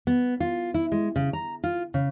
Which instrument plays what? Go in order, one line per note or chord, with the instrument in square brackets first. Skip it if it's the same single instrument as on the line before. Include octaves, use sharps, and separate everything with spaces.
[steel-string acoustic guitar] B3
F4
E4
G#3
C#3
A#5
F4
C#3